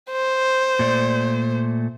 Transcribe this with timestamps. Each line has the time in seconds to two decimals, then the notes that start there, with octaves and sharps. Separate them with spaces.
0.11 C5
0.79 A#2 A3 D5